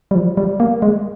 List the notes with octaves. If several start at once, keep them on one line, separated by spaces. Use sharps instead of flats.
G3
F3
G3
A#3
G#3